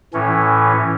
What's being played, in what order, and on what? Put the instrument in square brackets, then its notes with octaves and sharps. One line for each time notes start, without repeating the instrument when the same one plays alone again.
[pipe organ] A2 E3 C#4